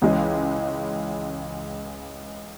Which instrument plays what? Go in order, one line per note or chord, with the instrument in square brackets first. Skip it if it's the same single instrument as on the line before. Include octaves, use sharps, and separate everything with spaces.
[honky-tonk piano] C#2 C#3 E3 G#3 C#4